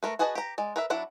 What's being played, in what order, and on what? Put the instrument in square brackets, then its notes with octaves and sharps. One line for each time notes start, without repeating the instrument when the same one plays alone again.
[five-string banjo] A3 A#4 B4
F#4 G#4 B4 D#5 A5
G4 A#5
G#3 D5
A#4 B4 E5
F#3 D4 E4 F#5